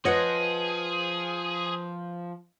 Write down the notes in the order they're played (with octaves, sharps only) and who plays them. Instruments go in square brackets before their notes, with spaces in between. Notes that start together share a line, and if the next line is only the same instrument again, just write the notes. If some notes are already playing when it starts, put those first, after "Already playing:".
[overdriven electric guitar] F3 [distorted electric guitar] G#4 [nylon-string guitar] B4 C#5 [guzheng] D#5 F#5